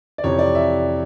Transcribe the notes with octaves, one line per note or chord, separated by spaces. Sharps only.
D5
F2 C3 E3 C#5
D5
E5